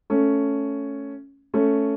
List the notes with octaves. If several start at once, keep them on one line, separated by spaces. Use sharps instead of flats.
A3 C#4
A3 C#4